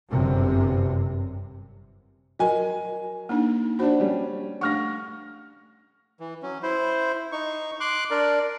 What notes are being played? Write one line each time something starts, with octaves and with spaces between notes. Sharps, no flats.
G1 F#2 C3
F#3 A#4 D#5 G#5
A#3 D4 D#4
D4 F#4 C5 B5
G3 C#4
A3 D4 F#5 C#6 F6 A#6
E3
F#3 C#4
E4 C5
D#4 C#6
C6 D6 F#6
D4 A#4 D5